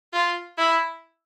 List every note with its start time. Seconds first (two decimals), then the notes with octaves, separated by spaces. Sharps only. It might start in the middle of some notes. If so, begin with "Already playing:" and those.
0.13 F4
0.58 E4